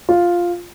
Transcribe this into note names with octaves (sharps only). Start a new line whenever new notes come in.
F4